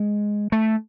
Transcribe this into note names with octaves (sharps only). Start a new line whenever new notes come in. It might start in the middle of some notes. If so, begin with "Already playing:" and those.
Already playing: G#3
A3